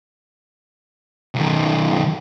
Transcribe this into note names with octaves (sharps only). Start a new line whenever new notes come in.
B1 D#3